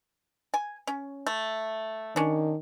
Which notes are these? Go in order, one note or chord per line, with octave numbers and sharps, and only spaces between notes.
G#5
C#4
A3
D#3 C#4 D4